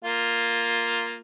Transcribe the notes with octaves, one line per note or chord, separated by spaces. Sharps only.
A#3 F4